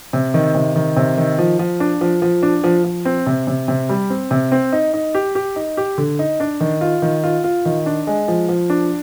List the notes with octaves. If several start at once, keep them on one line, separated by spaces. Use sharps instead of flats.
C3
D#3
C3
D#3
C3
D#3
F3
F3
D4
F3
F3
D4
F3
F3
C4
C3
C3
C3
G3
C4
C3
C4
D#4
D#4
G4
G4
D#4
G4
D3
D#4
D4
D#3
F4
D#3
F4
F4
D#3
D4
G#3
F3
F3
D4